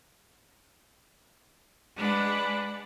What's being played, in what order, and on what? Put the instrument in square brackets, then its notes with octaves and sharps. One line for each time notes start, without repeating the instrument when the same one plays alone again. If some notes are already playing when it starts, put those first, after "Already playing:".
[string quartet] G#3 D4 B4 F#5